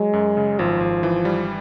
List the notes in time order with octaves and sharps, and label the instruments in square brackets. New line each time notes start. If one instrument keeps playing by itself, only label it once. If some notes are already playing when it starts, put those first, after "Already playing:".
Already playing: [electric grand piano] F#3 [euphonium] G#3
[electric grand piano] F#2
C#3
[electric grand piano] G#1 [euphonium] F3
[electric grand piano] G#1
E3
G3